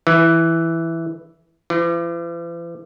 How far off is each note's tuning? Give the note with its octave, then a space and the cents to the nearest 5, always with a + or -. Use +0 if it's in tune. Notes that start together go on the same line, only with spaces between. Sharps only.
E3 +0
E3 +45